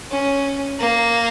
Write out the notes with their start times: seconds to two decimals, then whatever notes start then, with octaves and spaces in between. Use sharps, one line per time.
0.11 C#4
0.80 A#3